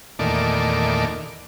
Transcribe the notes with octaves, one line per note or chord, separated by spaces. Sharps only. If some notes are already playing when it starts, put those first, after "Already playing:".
E2 A#2 D#3 A3 D5